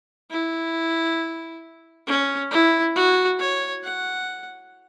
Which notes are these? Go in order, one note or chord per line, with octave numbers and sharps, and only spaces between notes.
E4
C#4
E4
F#4
C#5
F#5